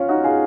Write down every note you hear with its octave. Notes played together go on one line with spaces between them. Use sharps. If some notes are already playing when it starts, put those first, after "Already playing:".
Already playing: C#4 F4
D#4 F#4
F4 G#4